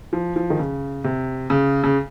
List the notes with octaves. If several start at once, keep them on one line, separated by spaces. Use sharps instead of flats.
F3
F3
D#3
C#3
C3
C#3
C#3